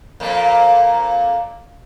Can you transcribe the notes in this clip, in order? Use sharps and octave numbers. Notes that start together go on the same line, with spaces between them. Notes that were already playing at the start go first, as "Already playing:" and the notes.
F2 A#2 A#3